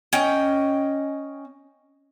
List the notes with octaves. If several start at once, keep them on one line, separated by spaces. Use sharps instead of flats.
C#4 D#5 G5